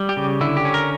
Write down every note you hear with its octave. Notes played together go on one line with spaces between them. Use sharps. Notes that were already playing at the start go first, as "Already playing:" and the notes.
Already playing: G3
G4
C#3
D3 E4
G4
C#4
A#4